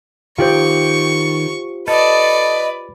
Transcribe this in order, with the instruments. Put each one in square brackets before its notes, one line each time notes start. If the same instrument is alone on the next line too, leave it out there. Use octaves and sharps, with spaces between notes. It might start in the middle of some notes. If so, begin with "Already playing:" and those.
[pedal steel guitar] D#3 D5 G5 [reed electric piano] F4 G4 C5 [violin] C#6
[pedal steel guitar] A4 [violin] B4 D5 [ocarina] D#5